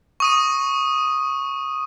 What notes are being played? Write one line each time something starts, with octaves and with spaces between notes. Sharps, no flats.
C#6 D#6 D#7